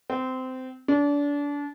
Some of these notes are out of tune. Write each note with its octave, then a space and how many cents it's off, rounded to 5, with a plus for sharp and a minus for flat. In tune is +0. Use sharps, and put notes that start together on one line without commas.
C4 -20
D4 -30